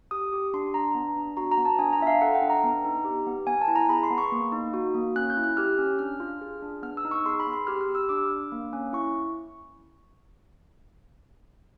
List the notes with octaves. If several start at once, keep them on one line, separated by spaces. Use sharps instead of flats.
G4 D#6
G4
D4 C6
D4 A#5
B3
D4
F#4 A#5
A#5
B3
A5
D4 G#5
A#5
F4 E5
F5
A4 F#5
G5
D4
A#5
B3
D#4
G4
B3
B3 G#5
A5
E4
A#5
G#4 B5
C6
B3
C#6
A#3
D#4
F#4
A#3
C#4 F#6
G6
E4
F#6
G4 F6
C#4
D4 F6
F4
G#4
D4
B3 F6
E6
D#4
C#6
G#4 C6
B5
B3
C6
G4 F6
F6
G4
E6
D4 D6
D4
A#3
C#4
E4 C#6